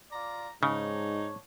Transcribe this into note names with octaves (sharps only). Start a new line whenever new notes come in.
F4 D5 A#5
G#2 C#3 D4 D#4 C#5